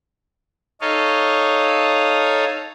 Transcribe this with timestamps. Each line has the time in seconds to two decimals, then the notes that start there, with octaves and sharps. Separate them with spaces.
0.81 D#4 A4 C#5 D#5 F5